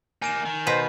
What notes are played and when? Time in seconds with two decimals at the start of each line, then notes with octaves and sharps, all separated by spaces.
0.22 A#3 D#4 G#5 D7 E7
0.45 D#3
0.67 B2 B4 C5 A#5